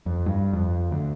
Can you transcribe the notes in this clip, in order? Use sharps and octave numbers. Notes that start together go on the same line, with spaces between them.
F2
G2
F2
D2